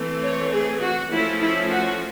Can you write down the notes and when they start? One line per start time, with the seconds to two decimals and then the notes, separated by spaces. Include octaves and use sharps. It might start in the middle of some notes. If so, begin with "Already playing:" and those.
Already playing: E3 A3 C4
0.23 C#5
0.52 G#4
0.81 F#4
1.11 F3 A3 C#4 E4
1.41 E4
1.71 F#4